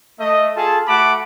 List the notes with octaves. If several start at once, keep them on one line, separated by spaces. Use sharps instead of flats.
A3 D#5
F4 G#4 A4 A5
A3 F#4 F#5 A5 B5 D6